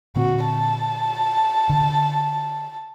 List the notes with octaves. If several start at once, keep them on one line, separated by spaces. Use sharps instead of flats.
A#2 D3 C4 F#4
A5
D3